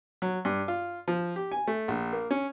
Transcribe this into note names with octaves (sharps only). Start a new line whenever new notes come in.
F#3
G2
F4
F3
G4
G#5
A3
A#1
A#3
C#4